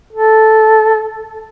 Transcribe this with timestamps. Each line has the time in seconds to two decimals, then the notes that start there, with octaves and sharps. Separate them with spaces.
0.13 A4